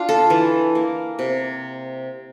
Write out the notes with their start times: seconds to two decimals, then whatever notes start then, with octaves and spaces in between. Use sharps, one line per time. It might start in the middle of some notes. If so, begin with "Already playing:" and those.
Already playing: D4 F4
0.09 A4
0.30 E3
0.75 A#3
1.19 C3